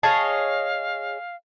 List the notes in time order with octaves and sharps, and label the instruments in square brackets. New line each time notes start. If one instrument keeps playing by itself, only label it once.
[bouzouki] G#4 C#5 D#5 [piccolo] F5 [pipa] A5